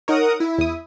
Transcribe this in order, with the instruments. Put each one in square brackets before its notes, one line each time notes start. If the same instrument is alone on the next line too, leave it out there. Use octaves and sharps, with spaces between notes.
[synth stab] D#4 C#5 [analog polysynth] A#4 F#5 D#6
[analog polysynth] E4
[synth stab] E2 D#6